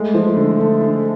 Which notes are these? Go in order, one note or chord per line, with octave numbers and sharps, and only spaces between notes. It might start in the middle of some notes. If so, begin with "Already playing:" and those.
Already playing: G#3 A3
F3
D3
D3
D3